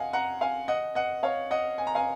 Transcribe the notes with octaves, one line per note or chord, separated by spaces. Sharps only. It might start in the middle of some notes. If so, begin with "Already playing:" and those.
Already playing: D#5 F5 F#5 G#5
F#5 A#5
F5 G#5
D#5 F#5
D#5 F#5
C#5 F5
D#5 F#5
G#5
A#5
F5 G#5